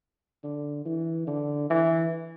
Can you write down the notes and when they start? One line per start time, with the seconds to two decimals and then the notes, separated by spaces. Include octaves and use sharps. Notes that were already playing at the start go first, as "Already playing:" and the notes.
0.44 D3
0.86 E3
1.27 D3
1.70 E3